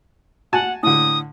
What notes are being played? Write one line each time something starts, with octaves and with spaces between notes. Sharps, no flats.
F#4 F#5 G#5 A5
A2 D3 D#6